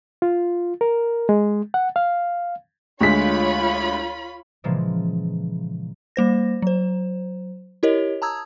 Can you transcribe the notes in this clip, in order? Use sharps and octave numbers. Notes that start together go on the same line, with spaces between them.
F4
A#4
G#3
F#5
F5
D2 G#3 F4 C#5 B5 B6
A#2 C#3 E3 F3 G#3 A#3
G3 A#3 C5 A#6
F#3 C5
E4 G4 A#4 C#5 D#5
A5 A#5 D#6 E6 G#6